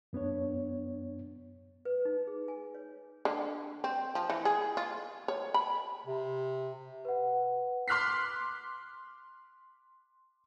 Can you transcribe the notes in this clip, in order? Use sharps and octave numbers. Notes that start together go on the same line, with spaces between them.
F#2 B3 D4 C#5
B4
D#4
G#4
G#5
C#5
D3
C4
F3
E3
G#4
F4
C#5
B5
C3
B4 F#5
C6 D6 F6 F#6 B6 C7